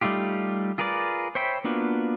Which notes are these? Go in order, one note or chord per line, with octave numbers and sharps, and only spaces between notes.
G3 A3 D#4 F4 G4
F4 G#4 A#4 B4 D5
C5 C#5 E5 G5 B5
A#3 B3 D4 F4 F#4